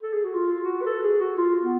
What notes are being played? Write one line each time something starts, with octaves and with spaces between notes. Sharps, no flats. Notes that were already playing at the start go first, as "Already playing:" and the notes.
A4
G#4
F#4
F4
F#4
B4
A4
G#4
F#4
F4
B3